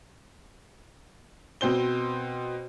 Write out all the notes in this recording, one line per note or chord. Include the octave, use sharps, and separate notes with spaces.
B2 C4 C5 G7